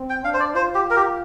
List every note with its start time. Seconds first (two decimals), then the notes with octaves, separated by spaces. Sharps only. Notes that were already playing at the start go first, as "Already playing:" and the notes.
Already playing: C4
0.10 G5
0.24 D4 F5
0.34 C5
0.40 D5
0.55 F4 C5
0.75 G4
0.90 A#4
0.96 G4